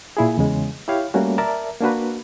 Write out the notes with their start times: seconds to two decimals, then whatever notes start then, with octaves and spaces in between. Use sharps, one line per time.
0.17 A#2 E4 G#4
0.38 E2 C#3 G#3
0.88 E4 G4 C#5 F5
1.14 G3 A3 A#3 C#4 F#4
1.38 A#4 D5 E5 A5 A#5
1.81 A#3 D4 F#4 B4